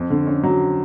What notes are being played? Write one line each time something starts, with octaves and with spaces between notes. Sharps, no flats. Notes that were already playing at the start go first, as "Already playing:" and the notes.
Already playing: F2
D3
C#4
F#3